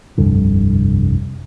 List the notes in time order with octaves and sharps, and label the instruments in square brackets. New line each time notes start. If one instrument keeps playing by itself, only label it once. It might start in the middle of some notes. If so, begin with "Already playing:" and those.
[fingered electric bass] F1 C2 G2 D3